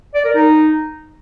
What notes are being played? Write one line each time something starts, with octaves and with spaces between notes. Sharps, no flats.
D5
A#4
D#4